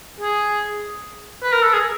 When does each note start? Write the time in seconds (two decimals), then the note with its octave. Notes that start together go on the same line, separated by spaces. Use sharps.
0.21 G#4
1.42 B4
1.53 A#4
1.63 A4
1.73 G#4